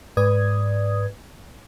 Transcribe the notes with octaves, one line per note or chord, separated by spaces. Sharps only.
G#2 B4 D5 D#6 G#6